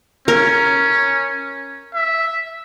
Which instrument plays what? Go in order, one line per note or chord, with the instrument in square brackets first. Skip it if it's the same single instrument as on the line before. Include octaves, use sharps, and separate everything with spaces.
[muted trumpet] C#4 [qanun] A#4
[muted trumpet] E5